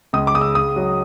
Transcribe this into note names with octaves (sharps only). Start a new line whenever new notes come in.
C#2 D#6
D6
C#3 D#6
E6
C#3 D#6
F#3